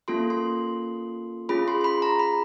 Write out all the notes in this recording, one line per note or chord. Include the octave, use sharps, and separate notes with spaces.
A#3 C#4 F4 A4 C6
C6
C#4 F4 G#4 B5
C6
C6
B5
A#5
B5